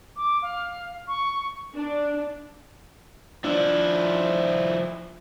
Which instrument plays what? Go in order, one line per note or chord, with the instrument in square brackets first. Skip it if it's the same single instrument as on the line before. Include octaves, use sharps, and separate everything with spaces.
[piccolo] D6
F5
C#6
[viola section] D4
[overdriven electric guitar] F3 E4 [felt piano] D4